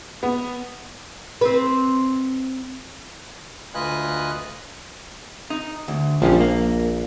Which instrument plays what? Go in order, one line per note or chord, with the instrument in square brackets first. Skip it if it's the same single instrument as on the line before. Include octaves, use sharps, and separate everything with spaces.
[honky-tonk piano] B3
[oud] C4 B4
[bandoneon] D2 F4 B4 D#5 G#5 F#6
[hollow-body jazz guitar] D#4
D2
[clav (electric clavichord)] A#1 [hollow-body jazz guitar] F3 G3 C#4
[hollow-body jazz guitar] A#3